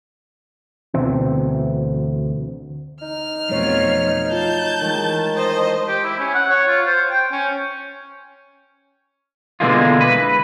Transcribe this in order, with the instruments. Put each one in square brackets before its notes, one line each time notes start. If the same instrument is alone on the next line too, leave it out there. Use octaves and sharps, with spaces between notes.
[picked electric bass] D2 B2 E3 C4
[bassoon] D#4 [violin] F6
[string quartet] F2 B2 [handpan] F#3 A3 C#5
[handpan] F4 [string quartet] A5 [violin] G6
[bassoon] D#3 [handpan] E3 G#3
[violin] C5 D#5
[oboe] G4
E4
C#4
F#5
C#5
F4
C5
G5
C#4
[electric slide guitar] B2 D3 E3 G#3 A#3 F4
B4